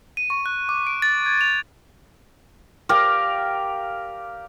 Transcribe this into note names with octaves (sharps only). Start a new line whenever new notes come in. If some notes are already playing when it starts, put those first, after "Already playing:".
D#7
C#6
F#6
D6
D7
A6
G#6
F7
G4 A#4 D5 F5